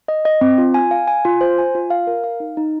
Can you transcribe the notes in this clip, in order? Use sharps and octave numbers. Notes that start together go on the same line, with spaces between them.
D#5
D#5
C4
F4
G#5
F5
G#5
F4
C5
G#5
F4
F5
A#4
F5
D#4
D#4